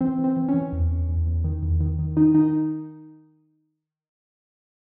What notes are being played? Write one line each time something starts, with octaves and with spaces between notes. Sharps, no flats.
E3 C4
E3
C4
E3
C#4
E3
E2
E2
E2
E2
D#3
E2
D#3
D#3
D#3 D#4
D#3 D#4